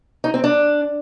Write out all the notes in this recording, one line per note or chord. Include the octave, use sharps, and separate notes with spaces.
D#4
C4
D4